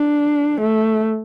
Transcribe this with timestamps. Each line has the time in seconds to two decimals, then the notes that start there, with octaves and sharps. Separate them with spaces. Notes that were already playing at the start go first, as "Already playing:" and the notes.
Already playing: D4
0.61 A3